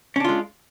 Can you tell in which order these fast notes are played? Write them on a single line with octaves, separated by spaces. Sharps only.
C#4 D4 F4 G#3